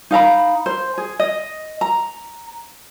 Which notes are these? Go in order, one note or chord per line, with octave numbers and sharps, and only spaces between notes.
D#4 F5 A#5 B5
C5
G#4
D#5
A#5